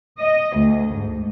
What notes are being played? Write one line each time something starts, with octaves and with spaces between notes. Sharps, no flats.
D#5
D2
G#2